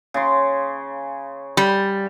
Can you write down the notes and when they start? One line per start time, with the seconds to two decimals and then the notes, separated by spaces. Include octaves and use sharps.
0.14 C#3 C6
1.57 G3